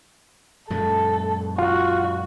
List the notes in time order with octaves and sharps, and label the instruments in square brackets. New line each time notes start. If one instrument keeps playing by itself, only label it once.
[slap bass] F#2 A#2 G#3 [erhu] A4
[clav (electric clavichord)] F4 [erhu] F#4